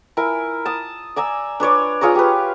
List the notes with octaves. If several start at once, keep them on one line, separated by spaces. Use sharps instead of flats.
E4 A#4 G#5
A5 D#6
D5 G#5 A#5 E6
D4 B4 C#5 D5
F4 G#4 C#5 A#5
G4 B4